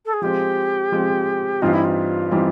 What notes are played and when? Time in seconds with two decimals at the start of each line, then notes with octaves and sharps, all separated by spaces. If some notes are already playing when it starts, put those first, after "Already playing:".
0.05 A4
0.13 G#4
0.22 F3 G#3 C4 G4
0.92 F3 G#3 C4
1.62 G2 E3 G3 C4 D#4 F4
1.73 E4
1.84 F4
2.31 E3 G3 C4 D#4